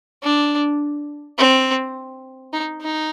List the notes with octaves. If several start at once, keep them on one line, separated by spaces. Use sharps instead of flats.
D4
C4
D#4
D#4